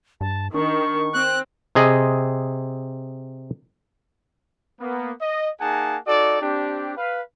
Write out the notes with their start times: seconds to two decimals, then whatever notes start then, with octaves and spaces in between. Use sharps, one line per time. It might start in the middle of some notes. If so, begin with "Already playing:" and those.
0.21 G2 A5
0.54 D#3 D4 C#6
1.14 C4 F#6
1.75 C3 G#4 D#5
4.80 A#3 B3
5.21 D#5
5.60 A#3 D#4 G#4 F#5 G#5 A5
6.07 D#4 F#4 A4 D5
6.41 C4 D4 G4
6.97 B4 F5